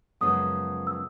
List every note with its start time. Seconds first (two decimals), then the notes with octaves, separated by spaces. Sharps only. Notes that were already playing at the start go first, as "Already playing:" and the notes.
0.21 F#2 C#3 F3 G#3 B3 D#6
0.87 E6